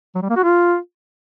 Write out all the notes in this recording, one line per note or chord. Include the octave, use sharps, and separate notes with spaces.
F#3
G3
A#3
F#4
F4